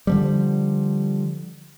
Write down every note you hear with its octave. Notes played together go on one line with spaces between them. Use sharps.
D3 F3 G3